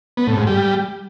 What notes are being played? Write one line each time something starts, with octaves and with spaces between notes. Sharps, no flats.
B3
A2
G#2
G3